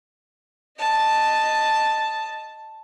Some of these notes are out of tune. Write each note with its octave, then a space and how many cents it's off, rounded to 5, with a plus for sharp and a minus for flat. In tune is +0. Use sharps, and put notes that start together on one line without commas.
D#5 +0 A5 +0